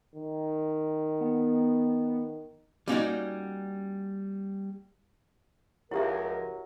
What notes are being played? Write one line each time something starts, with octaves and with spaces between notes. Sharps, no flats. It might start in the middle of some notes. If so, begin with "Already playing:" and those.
D#3
B3
G3 A#3 C#4 D#4 F#4 D5
C#2 F3 F#3 E4 G4 A#4 E5